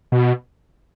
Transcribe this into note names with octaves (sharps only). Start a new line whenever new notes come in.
B2